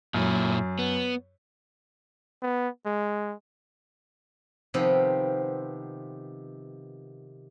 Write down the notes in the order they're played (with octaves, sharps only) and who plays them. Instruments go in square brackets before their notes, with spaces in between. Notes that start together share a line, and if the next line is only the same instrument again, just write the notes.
[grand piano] F#2 [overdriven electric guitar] A#2 E4
[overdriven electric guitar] B3
[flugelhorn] B3
G#3
[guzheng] C3 D#3 F3 B3 C4